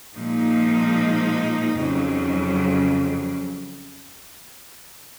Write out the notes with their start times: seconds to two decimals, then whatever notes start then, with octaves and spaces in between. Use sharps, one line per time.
0.16 A#2 F3 G#3 D#4
1.78 F2 C#3 F#3